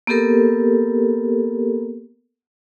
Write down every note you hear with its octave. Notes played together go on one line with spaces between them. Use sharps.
A#3 B3 G4 A4 A#4